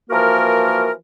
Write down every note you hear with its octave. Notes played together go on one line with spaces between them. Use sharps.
E3 F3 A#3 F#4 A#4